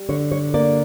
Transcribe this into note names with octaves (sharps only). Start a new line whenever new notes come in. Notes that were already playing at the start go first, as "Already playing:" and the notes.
Already playing: G3
D3 C#5
C#5
A#3 D5